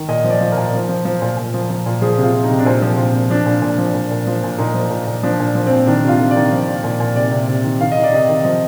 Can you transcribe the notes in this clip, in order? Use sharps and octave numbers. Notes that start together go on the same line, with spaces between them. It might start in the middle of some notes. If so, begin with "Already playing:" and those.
Already playing: D#3
A#2 D#5
F3
D5
F3
A#4
A#2
F3
F3
F3
A#2
A#2
F3
F3
A#2
F3 G#4
C3
F4
C3
D#4
C3
D4
A#2 C4
F3
A#2
F3
F3 D4
A#2
A#2
F3
A#2
A#2
F3
A#2
A#2 D#4
F3
A#2
A#2
F3 D4
A#2
F3
C4
A#2
D#3 D4
C3 F4
D#3
D#3 D5
F3
A#2
A#2
A#2
C3 D5
C3
C3
D#3
D#3 F5
D#5
D#3
D5
C3 D#5
D#3
F3 D#5